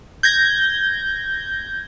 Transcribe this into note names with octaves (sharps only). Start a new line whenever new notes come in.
G6 G#6 A#6